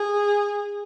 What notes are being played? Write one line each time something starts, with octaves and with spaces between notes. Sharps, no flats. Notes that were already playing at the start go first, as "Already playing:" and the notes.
Already playing: G#4